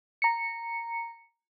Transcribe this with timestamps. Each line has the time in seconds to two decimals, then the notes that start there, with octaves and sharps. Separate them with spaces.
0.22 A#5 C#7